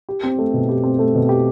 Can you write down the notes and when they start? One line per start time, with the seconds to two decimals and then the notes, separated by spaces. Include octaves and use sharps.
0.09 G4
0.23 C4
0.39 A3
0.54 B2
0.69 G4
0.84 C4
0.99 A3
1.15 B2
1.29 G4